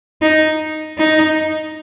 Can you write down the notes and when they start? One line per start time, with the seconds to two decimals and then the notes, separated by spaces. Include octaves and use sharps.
0.22 D#4
0.98 D#4